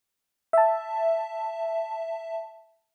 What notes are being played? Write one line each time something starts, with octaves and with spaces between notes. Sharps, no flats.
E5 A5